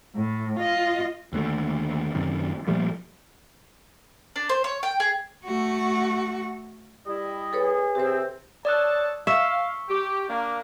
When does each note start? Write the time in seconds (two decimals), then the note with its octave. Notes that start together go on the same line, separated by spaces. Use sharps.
0.15 A2
0.59 F4 D#5
1.33 D#2 D3 G#3 A3
2.15 F#2 C3 D#3
2.67 A#2 F3 G3 A3
4.36 D4
4.49 C5
4.64 C#5
4.83 G5
5.00 G#4
5.45 A3 F#4
7.06 G3 E4 D#5
7.53 G#4 A4 B4 C#5
7.95 C3 C4 G4 C5
8.65 A4 C#5 D5 A5 D#6 F#6
9.27 E5 F5 C#6
9.89 G4
10.28 A#3 D4